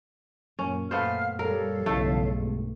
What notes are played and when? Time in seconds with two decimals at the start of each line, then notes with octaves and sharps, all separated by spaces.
0.59 F#2 A#2 A#3 C#4
0.91 A3 B3 C5 F5 F6
1.39 G3 A4 A#4 C#5 F5
1.86 B1 G2 C#3 E3 A3 D#5
2.28 B2 G#3